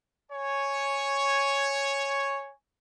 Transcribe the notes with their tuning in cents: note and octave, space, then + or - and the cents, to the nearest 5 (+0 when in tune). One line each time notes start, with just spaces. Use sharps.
C#5 +0 G#5 +0